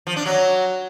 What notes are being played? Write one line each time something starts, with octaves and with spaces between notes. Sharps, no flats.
F3
D4
F#3